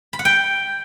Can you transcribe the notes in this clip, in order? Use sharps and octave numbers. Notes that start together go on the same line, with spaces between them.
B5
F#5
G5